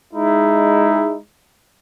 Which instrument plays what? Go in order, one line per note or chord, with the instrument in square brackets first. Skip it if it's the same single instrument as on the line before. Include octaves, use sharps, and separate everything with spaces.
[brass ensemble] G#3 D#4 E4